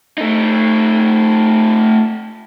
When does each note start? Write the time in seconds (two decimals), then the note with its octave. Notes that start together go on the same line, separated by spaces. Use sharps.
0.18 A3 D#4